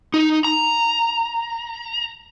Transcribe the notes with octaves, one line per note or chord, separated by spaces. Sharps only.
D#4
A#5